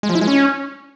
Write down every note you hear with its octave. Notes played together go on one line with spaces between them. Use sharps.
G#3
F3
E4
G#3
C#4